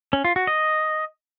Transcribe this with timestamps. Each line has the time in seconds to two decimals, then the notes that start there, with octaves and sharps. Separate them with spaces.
0.13 C#4
0.25 F4
0.36 F#4
0.47 D#5